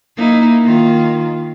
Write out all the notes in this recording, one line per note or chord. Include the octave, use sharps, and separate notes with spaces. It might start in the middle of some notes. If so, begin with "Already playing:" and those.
A#3 D#4 E4
D#3 A#3 F4